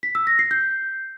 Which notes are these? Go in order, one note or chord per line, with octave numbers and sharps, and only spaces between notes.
B6
E6
A#6
C7
G6